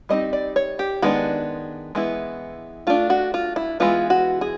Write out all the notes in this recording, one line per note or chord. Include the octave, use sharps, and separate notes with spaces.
G3 C4 D#4 D#5
D5
C#5
G4
D#3 G#3 B3 D4 F#4
E3 G#3 B3 E4
A3 D4 F4
F#4
F4
E4
E3 G#3 B3 F4
F#4
G#4